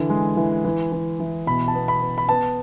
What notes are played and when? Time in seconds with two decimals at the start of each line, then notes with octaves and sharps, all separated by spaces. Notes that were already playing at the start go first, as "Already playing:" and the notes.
Already playing: D3 E3
0.10 G#3
0.37 E3
0.65 E3
0.92 E3
1.20 E3
1.47 B2 B5
1.68 A5
1.75 B3
1.88 B5
2.01 B3
2.18 B5
2.29 B3 A5